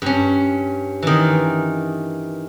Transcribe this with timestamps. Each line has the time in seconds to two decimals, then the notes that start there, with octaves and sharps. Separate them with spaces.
0.02 G2 C#4
1.03 D#3 E3